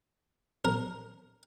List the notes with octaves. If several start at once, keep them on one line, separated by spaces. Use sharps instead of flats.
A#4